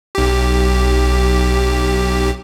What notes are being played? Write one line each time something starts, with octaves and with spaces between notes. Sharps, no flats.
B1 G4